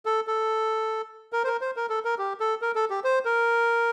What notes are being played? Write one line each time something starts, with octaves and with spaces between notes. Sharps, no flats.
A4
A4
A#4
C5
A#4
C5
A#4
A4
A#4
G4
A4
A#4
A4
G4
C5
A#4